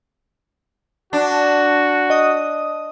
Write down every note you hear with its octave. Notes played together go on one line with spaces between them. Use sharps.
D4 F#4
D#5 D#6